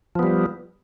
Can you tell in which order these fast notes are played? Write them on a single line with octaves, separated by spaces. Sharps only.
F3 B3 G3